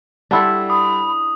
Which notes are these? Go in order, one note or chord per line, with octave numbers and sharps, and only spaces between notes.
G3 D4 E4 A4 F#5 C6
B5 D#6